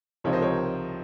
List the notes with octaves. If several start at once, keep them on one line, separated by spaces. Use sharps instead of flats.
C#2 C3 F3 C4 D#4 A#4 C#5
C5 D#5
A#4 C#5